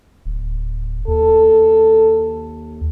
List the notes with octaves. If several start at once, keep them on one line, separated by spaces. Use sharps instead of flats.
D1
D#2 A4